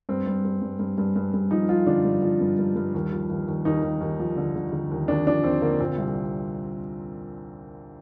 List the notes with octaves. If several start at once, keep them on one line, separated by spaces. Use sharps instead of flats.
G2 C4
G2
G2
G2
G2
G2
G2
G2
F3 D#4
F3 F4
D3 D4
G2
F3
G2
G2
G2
D#2
F3
D#2
D#2
D#2 D#4
D#2
D#2
F3
D3
D3
D3
D#2
D#2 D4
F3 D4
D#2 C4
D3 A#3
A#2 C4
C2